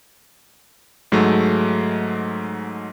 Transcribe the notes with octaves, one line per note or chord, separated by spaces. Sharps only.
G#2 F#3 G#3 A3